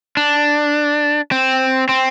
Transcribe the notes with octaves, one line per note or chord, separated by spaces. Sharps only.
D4
C4
C4